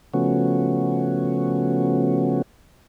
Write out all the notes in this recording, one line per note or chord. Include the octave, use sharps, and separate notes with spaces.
C#3 F3 A3 B3 C#4 F#4